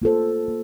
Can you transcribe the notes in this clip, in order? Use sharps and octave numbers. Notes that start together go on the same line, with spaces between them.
A#3 F4 A4 C5
A#3